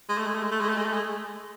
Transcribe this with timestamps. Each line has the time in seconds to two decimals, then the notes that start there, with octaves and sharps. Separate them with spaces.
0.09 G#3
0.18 A3
0.26 G#3
0.35 A3
0.43 G#3
0.51 A3
0.61 G#3
0.69 A3
0.77 G#3
0.85 A3
0.94 G#3